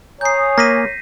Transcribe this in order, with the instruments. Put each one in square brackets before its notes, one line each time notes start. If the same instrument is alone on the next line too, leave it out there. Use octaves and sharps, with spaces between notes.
[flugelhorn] C#5 [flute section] G#5 A#5 D#6 [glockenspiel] G6 C7
[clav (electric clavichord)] A#3 [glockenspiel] A#6 B6 D#7